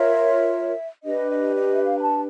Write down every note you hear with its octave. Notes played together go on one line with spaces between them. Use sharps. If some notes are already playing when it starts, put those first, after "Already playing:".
Already playing: F4 A#4 C#5 E5
D4 G4 B4 D#5
D#5
D#5
E5
F5
A#5
A5